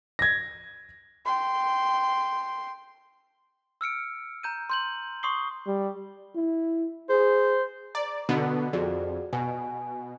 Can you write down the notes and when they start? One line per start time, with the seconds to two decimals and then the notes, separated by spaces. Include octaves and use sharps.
0.19 G#6 A#6
1.25 G5 C6
3.81 E6 F6 C#7 D7
4.43 A#5 G6 D#7
4.70 C6 G6 F#7
5.23 C6 C#6 D#6 C7 G7
5.67 G3
6.35 E4
7.09 G#4 C5
7.95 D5 A#5
8.29 B2 D3 B3
8.73 F2 F#4 G#4 D5
9.33 B2 G#5